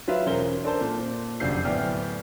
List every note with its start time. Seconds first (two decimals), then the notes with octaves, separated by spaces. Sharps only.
0.08 F#3 F4 B4 E5
0.26 E1 C#4 A#4 C5 G7
0.64 D4 A4 A#4 C5 A5
0.81 A#2
1.40 F1 F#2 D3 G6 C7
1.64 D1 B3 E4 D5 G5 F6